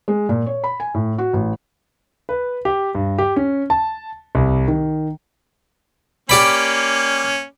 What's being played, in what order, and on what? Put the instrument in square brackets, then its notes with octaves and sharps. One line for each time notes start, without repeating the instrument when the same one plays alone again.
[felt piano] G#3
A#2
C#5
B5
G#5
A2
F#4
A1
[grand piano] B4
G4
G2
G4
C#4
A5
C2
D#3
[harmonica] A#3 C#4 [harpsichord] G4 D5 B5